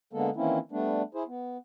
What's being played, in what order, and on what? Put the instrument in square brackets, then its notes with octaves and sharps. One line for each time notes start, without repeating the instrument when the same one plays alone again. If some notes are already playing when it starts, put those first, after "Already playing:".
[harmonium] D3 G#3 A#3 B3 A4
D#3 E3 A#3 C4 C#4 E4
G3 A3 B3 D4
E4 G#4 C5
B3